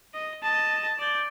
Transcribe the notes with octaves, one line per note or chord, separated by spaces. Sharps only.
D#5
D#5 A5
D5 G6